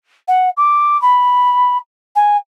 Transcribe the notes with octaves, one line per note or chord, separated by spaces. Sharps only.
F#5
D6
B5
G#5